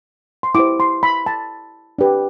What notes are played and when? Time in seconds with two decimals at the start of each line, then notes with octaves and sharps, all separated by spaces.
0.43 C6
0.55 E4 G4 C5 D6
0.80 C6
1.03 B5
1.26 A5
1.98 D4 G4 B4